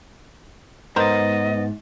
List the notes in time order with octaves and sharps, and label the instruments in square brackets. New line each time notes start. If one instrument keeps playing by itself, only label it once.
[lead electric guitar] G#2 [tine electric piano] B3 A6 [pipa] A#4 C5 [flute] D#5